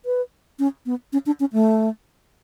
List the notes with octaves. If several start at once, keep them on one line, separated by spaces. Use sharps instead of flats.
B4
C#4
B3
C#4
D4
C#4
A3